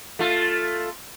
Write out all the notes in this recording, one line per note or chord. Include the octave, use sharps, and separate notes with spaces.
A3 F4